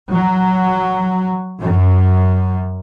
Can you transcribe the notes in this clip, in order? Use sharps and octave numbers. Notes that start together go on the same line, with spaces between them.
F#3
F#2